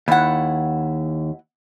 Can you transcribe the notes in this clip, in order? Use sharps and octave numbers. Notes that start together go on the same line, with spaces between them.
D#2 E4 F#5